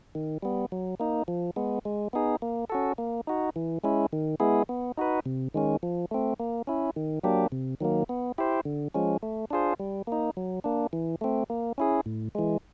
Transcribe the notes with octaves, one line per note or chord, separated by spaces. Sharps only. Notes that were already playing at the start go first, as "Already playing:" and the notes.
D#3
G3 B3
F#3
A#3 D#4
F3
G#3 B3
G#3
B3 D#4 G#4
A#3
C#4 F#4 A4
A#3
D#4 F#4
E3
G#3 C#4 E4
D#3
G#3 B3 E4 G#4
B3
D#4 F#4 B4
C3
D#3 G#3 C#4
F3
A3 C4
A#3
C#4 E4
D#3
F#3 A#3 D4 G4
C3
D#3 F#3 A#3
B3
E4 G4 C5
D3
F3 G#3 C#4
A3
D4 F4 G#4 C5
G3
A#3 D#4
F#3
A#3 D4
E3
A3 C4
A#3
C#4 E4 G#4
A2
E3 G#3